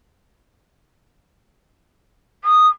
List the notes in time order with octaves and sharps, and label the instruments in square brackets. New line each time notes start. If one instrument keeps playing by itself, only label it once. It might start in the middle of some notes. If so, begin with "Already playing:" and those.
[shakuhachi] D#6